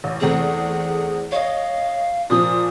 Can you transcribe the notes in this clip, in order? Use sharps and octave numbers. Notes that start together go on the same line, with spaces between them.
A1
E2 A3 C4 G#4
C#5 D#5 F5
A#2 F3 D#6